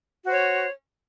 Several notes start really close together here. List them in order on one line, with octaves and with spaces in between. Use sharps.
F#4 C5 C#5